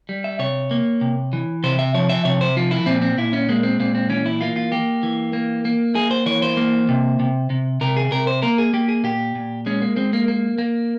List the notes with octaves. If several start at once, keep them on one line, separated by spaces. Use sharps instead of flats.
G3
E5
C3 C#5
A#3
C3
E3
C3 C5
E5
F3 C#5
E5
C3 C#5
C5
F3 F4
E4
A#2 C4
C4
A#2 E4
C#4
G#3 A#3
C4
A#2 C4
C4
E3 C#4
E4
A#3 F4
F4
A#3 G4
E3
A#3
A#3
A#3 G#4
C5
E3 C#5
C5
A#3
C3
C3
C3
C3 A#4
G#4
C3 A#4
C5
A#3 A#4
G#4
A#3 G4
G#4
A#2 G4
A#2
G#3 C#4
A#3
G#3 C4
A#3
A#3
A#3